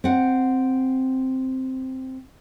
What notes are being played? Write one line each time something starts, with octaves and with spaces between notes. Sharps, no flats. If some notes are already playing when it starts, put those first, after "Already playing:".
C4 F#5